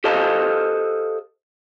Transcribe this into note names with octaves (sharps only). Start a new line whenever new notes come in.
G4 A4 C5 D#5 F5 A5